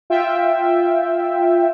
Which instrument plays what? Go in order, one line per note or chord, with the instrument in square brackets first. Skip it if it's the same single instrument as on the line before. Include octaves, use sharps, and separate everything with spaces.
[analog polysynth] F4 E5 G5